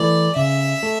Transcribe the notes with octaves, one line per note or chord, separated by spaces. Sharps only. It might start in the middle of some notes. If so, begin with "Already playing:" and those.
Already playing: E3 A3 D5
C#3 E5
A3